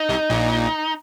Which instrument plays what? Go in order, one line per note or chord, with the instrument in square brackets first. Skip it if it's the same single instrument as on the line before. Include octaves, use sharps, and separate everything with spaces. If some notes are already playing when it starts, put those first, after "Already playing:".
Already playing: [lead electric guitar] D#4
[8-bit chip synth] C2 C3
A#1 A#2